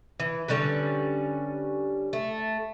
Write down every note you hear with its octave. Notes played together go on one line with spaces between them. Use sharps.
E3
D3 G3 C#4 B4
A3